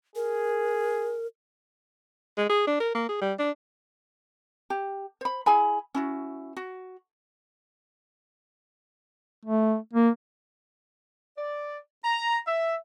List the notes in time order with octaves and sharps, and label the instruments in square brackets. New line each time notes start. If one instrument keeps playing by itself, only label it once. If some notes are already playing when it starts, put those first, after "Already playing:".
[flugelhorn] G#4 [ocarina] A#4
[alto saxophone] G#3
G#4
D4
A#4
A#3
G#4
G3
D4
[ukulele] G4
C5 B5
E4 G#4 G#5 B5
C#4 E4 F#4
F#4
[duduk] A3
A#3
[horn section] D5
A#5
E5